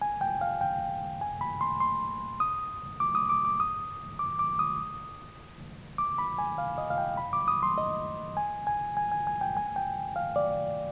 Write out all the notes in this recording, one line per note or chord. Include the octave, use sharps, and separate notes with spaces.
G#5
G5
F5
G5
G#5
B5
C6
C6
D#6
D6
D#6
D6
D6
D#6
D6
D6
D#6
D6
B5
G#5
F5
D#5
F5
G5
B5
D6
D#6
C6
D#5
G#5
G#5
G#5
G#5
G#5
G5
G#5
G5
F5
D5